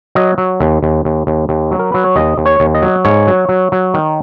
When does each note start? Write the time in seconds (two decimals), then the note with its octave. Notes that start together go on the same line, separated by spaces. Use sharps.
0.15 F#3 D#5
0.38 F#3
0.60 D#2
0.83 D#2
1.05 D#2
1.27 D#2
1.49 D#2
1.71 F#3
1.79 A#4
1.92 F#3 B4
2.04 C#5
2.16 D#2 D#5
2.38 D#2
2.46 C#5
2.60 D#2
2.75 D#5
2.82 F#3
3.05 G#2 C#5
3.27 F#3
3.49 F#3
3.72 F#3
3.94 D#3